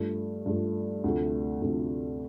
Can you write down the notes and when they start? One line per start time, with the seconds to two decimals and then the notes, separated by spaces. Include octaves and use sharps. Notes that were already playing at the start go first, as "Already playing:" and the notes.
Already playing: G2 F3 A3
0.46 G2 F3 A3
1.04 D2 C3 F3 A3
1.62 D2 C3 F3 A3